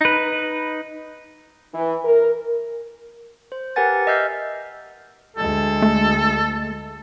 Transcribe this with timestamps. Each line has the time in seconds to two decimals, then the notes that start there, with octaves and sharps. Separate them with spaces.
0.01 D#4 B4
1.74 E3
2.05 A#4
3.52 C5
3.76 G4 A#4 B4 F#5 G#5 A6
4.07 D#5 E5 E6 F6 G6 C7
5.36 D2 G#3 A4
5.82 A3